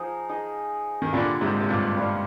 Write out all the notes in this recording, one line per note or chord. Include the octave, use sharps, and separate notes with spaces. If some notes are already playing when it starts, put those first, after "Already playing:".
Already playing: F3 D#4 G#4 D#5
D#4 G#4 D#5
D#3
A#2 D3 G3 D4 F4
G#2 C3
C3
G2 A#2
G2 G3 D4 F4